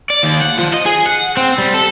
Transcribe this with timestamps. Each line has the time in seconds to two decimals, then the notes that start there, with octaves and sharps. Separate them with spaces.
0.10 D5
0.23 D#2
0.41 F#5
0.58 F3
0.73 D#5
0.86 G#4
1.06 F#5
1.37 C4
1.58 G3
1.74 A4